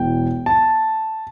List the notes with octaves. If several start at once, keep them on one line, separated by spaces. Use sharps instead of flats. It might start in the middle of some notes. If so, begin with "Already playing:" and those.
Already playing: E1 E3 G5
A5